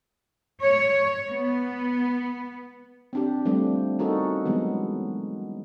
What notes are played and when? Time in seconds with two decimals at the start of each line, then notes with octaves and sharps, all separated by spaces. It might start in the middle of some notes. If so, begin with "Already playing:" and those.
0.63 C#5
1.30 B3
3.13 C4 D4 G4
3.45 F3 G3 A3 C4 D4
3.99 C#4 D#4 F#4 A4 A#4
4.45 E3 F#3 G#3 B3